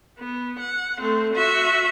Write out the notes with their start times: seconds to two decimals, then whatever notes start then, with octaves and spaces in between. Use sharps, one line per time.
0.19 B3
0.60 F#5
1.00 A3 C4
1.34 F#4 E5